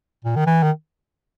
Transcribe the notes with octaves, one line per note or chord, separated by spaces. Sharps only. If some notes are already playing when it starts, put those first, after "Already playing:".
A#2
D#3
E3
D#3